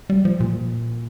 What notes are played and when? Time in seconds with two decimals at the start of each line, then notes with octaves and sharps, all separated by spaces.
0.10 G3
0.25 F3
0.40 A#2